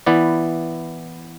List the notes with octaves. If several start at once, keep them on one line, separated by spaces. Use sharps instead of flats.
E3 B3 E4 B4 D5